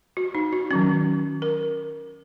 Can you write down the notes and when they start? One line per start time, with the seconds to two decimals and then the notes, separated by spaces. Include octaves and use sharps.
0.17 F#4
0.35 D#4
0.53 F#4
0.71 D#3 F#3 C#4
1.42 A#4